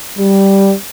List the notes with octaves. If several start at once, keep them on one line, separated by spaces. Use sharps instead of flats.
G3